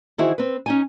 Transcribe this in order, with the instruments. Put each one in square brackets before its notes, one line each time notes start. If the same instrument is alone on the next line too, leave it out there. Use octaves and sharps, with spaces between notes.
[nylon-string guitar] D#3 E3 E4 F#4 G#4 C5
C4 B4
C#4 D#4 G#5